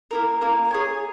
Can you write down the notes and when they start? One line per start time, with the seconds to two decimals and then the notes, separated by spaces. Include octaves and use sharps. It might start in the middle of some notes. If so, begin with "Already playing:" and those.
0.11 A#3 E4 A#4
0.41 A#3 E4 A#4
0.71 G#4 C#5 G#5